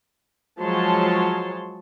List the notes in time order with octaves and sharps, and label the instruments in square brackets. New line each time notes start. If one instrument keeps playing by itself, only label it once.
[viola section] F3 F#3 G#3 C#5 A5 C6